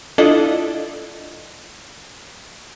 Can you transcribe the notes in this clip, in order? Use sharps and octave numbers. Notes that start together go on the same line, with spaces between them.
D4 E4 F4 A4 D5 D#5